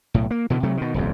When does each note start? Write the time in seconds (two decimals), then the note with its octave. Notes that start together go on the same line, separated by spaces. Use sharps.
0.14 B1 A2
0.31 A#3
0.50 B2 D3 E3
0.63 C3 F#3 A3
0.77 B2 D#3
0.94 D#1 C2 F2